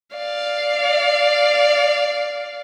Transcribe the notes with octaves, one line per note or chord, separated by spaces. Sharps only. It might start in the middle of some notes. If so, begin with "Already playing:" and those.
D5 F5